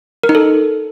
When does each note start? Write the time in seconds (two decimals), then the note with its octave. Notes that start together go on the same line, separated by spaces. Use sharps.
0.23 A#4
0.29 D#4
0.35 A4